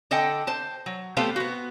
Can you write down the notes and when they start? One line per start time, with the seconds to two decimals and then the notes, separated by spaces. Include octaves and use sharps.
0.11 D3 A4 D#5 F#5 G5
0.47 C5 A5
0.86 F#3
1.17 A3 B3 G4 A4 C5 F5
1.36 B3 F#4